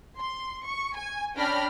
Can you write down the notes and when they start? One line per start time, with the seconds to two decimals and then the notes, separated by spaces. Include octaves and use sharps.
0.18 C6
0.66 C#6
0.97 G#5
1.36 C#4 D4 G5 B5 F6 A#6